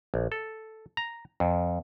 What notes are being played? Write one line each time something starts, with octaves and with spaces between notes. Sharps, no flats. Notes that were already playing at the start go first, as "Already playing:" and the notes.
A#1
A4
A#5
F2